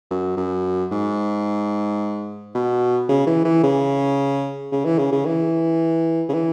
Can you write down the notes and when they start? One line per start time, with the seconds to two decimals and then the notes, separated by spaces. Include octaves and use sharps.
0.11 F#2
0.37 F#2
0.91 G#2
2.55 B2
3.09 C#3
3.27 E3
3.45 E3
3.64 C#3
4.72 C#3
4.85 E3
4.99 C#3
5.12 C#3
5.26 E3
6.29 C#3
6.34 E3